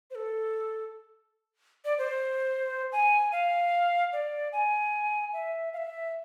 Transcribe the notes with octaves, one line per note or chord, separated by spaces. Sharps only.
C5
A4
D5
C5
G#5
F5
D5
G#5
E5
F5
E5